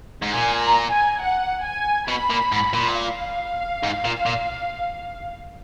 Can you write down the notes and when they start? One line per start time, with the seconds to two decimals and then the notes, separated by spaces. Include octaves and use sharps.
0.22 G#2
0.33 A#2 G#5
0.63 A#5
0.91 G#5
1.22 F#5
1.65 G#5
2.08 B2 B5
2.30 A#2
2.52 G#2
2.73 A#2
2.95 F5
3.83 G#2
4.05 A#2
4.26 A#2